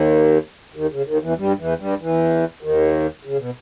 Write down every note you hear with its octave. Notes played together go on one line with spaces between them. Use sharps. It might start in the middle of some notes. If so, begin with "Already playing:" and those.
Already playing: D#2 D#3
D#2 D#3
C#3
D#2 D#3
E2 E3
G2 G3
E2 E3
G2 G3
E2 E3
D#2 D#3
C#3
B2